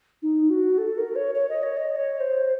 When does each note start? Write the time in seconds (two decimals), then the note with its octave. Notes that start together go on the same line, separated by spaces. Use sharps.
0.22 D#4
0.50 F#4
0.78 A4
0.98 A#4
1.16 C#5
1.35 C#5
1.49 D#5
1.63 C#5
1.77 D#5
1.92 D#5
1.96 C#5
2.20 C5